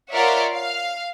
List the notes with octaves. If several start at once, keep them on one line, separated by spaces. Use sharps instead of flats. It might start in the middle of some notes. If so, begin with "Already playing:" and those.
F4 A#4 C#5 D5 E5 F#5
F5